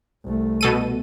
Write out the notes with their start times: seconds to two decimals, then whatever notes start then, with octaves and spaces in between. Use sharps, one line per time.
0.24 C2 A3
0.61 B2 A4 D#7